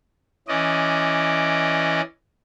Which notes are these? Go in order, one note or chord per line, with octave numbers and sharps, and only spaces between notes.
E3 C#4 D5 D#5